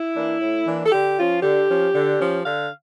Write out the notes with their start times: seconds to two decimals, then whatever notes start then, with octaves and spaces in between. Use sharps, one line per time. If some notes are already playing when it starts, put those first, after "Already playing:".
Already playing: E4
0.15 E3 A#3 D4
0.41 A2
0.66 E3 A#3 D4
0.85 A4
0.91 D3 G4
1.17 F3 C#4 F4
1.42 D3 G4
1.68 F3 C#4
1.94 D3
2.19 F3 C#4
2.44 D3 F5